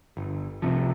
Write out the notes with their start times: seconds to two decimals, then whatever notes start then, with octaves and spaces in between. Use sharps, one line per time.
0.17 G1
0.62 C2 F2 C3 F3